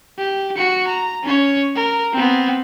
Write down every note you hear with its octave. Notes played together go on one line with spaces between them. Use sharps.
G4
F#4 C#7
A#5
C#4 C#5
A#4
B3 C4